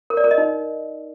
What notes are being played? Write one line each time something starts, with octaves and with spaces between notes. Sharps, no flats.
A#4
D5
A#4
D#5
D#4